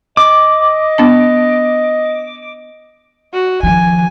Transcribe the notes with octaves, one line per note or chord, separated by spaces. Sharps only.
D#5 D6
B3 D4 A5
F#4
D#3 F3 G#5